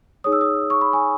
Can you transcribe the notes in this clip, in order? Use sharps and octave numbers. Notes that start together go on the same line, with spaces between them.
D#4 G#4 C#5 D#6
E6
D#6
C#6
B5
G#5